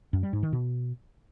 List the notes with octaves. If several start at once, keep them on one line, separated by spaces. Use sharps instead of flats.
F#2
G3
G#2
D#3
B2